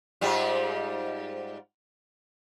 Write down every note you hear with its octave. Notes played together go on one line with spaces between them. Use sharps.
G#2 G3 F4